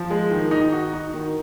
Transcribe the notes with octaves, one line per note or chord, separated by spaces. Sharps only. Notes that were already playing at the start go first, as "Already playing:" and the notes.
Already playing: F3
G#3
D#3
D#4
F#4
D#4
D#3